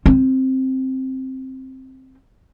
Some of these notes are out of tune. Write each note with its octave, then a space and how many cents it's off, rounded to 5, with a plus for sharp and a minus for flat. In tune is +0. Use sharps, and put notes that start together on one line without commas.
C4 +5